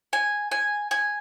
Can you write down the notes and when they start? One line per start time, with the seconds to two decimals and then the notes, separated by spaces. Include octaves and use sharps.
0.13 G#5
0.51 G#5
0.91 G#5